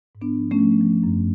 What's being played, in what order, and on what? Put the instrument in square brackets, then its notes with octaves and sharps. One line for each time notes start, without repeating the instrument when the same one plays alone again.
[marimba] G#2
B3 D4
F3
A3 C#4
F3
F3
F#2